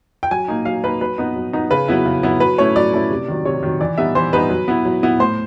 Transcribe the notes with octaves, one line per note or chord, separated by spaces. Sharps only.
G5
F#3 G#5
A#3 D#4
F#3 F5
A#3 D#4 B4
F#3 B4
B3 D#4
F#3
B3 D#4
C#3 B4
F#3 B3 E4
C#3
F#3 B3 E4
F#3 B4
A3 C#4 E4 C#5
F#3 D5
A3 C#4 E4
C3
D#3 F#3
C3 C#5
D#3 F#3
E3 D5
G3 B3 D#4 E5
E3 C5
G3 B3 D#4 B4
F#3
B3 E4
F#3
B3 E4
A2 C5